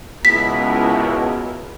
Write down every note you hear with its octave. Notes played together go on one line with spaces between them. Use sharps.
C#2 B2 B3 E4 A#4 B6